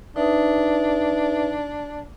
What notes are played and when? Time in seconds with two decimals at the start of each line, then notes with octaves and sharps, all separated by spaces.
0.16 D4 D#4 B4 E5